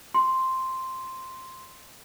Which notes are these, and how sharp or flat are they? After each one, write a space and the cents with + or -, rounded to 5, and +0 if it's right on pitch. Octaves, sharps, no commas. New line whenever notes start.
C6 +0